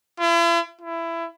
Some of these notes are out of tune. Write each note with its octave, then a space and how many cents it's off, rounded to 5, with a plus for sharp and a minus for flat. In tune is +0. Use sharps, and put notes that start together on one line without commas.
E4 +45
E4 +20